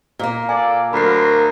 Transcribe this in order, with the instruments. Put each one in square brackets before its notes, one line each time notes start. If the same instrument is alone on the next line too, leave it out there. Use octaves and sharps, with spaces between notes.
[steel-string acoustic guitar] A#2 A#3
[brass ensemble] A4 D5 [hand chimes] G#5
[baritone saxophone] D2 [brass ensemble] F#3 A#4 [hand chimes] B5 C7